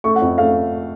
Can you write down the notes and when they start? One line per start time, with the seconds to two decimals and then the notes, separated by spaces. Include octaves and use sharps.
0.04 A3 C#6
0.16 F#5
0.22 F2
0.38 A3 F5